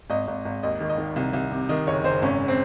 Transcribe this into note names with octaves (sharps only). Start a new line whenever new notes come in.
G#1 D#5
G#1
G#1
D#2 D#5
D#3
D#5
D#3
C2
C2
C3
D#3 D#5
F#1 C#5
F#1 C5
G#1 C#4
C4